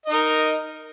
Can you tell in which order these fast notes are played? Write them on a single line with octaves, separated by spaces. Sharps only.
D#5 D#4 A#4